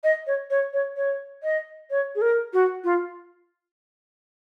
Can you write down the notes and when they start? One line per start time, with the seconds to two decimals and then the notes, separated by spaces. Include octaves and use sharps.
0.04 D#5
0.27 C#5
0.50 C#5
0.73 C#5
0.97 C#5
1.43 D#5
1.91 C#5
2.15 G#4
2.22 A#4
2.53 F#4
2.84 F4